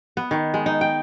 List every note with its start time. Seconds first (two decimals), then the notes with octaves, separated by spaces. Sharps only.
0.17 B3
0.31 D#3
0.54 G#3
0.66 D#4
0.81 G5